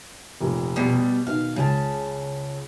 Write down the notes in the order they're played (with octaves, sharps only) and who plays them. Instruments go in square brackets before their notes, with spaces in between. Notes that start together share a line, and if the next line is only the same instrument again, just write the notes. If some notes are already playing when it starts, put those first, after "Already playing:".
[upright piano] F1 A#2
[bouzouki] B2 G3
[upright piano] B2 D#3 [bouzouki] F5
[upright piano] C#2 [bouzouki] C#3 A5